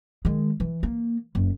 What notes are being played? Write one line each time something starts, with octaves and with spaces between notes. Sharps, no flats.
D#3 G#3
E3
A#3
F#1